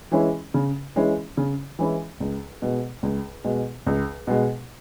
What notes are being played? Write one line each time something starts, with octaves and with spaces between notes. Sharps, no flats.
E3 G#3 C#4 E4
C#3
E3 G#3 C#4 E4
C#3
E3 G#3 C#4 E4
C#2
B2 G#3
C#2
B2 G#3
C#2
B2 G#3